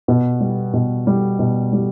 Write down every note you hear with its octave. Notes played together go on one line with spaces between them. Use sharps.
B2 B3
G3
B2
G3
B2
G3